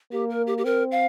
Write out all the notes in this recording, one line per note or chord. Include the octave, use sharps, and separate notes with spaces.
A#3 G4
A#4
G4
G4
C4 A#4
F5